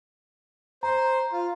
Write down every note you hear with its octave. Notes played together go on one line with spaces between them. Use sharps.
C5 A#5
F4